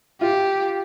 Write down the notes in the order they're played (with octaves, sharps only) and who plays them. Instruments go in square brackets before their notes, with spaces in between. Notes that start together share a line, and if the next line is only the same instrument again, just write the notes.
[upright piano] F4 [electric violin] G4